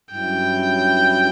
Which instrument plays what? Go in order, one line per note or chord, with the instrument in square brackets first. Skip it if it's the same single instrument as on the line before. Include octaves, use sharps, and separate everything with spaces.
[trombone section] G2 F#3 C#4 E4 [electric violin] G5